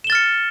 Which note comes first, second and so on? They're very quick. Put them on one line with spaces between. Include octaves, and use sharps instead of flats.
E7 G7 A6 F6 C#7